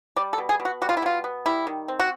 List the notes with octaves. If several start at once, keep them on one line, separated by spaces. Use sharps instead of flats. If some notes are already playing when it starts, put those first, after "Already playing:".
G3 D5
A4
B2
G#4
B2
F#4
G3 F#4
F4
E4
B2 F4
B3
G3 E4
D#3
C4
F#4